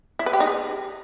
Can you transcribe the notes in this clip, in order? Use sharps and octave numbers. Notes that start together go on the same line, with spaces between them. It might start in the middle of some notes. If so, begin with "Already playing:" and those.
E4
B4
G4
D#4
G#4